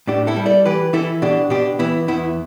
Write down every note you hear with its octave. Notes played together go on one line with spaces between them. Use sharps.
A2 D4 G4
E4 A4
G3
A4 D5
E3 G4 B4
E3 E4 A4
B2 D4 G4
B2 D4 G4
E3 B3 E4
E2 B3 E4